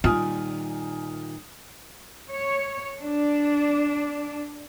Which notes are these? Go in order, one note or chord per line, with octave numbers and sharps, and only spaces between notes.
A#2 D#3 G3 F4 G#5 D#6 F6
C#5
D4